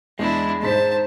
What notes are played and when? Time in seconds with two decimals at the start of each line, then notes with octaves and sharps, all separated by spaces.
0.19 E2 G#3 D4 E4
0.63 G#2 C5 A5 B6